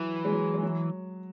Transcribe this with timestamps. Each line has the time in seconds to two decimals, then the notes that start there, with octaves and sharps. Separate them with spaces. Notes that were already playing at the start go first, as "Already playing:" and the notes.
Already playing: E3 F#3
0.25 G#3
0.32 F#3
0.54 G#3
0.63 F#3